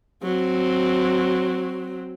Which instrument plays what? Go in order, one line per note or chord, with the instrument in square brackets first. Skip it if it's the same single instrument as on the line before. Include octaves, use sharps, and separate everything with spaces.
[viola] F#3 C4